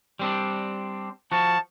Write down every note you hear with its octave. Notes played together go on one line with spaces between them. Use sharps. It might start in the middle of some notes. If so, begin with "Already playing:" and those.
G3 C4 D4
F3 F#4 A5